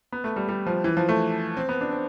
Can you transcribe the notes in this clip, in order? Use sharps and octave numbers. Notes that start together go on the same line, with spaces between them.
B3
A3
G3
G3
F3
E3
F3
A3
C4
B3
D4
C4